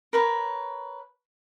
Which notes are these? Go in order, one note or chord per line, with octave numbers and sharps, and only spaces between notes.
A#4 B4 C#5